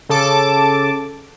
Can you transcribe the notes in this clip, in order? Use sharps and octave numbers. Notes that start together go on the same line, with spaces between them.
C#3 A4 A5 D6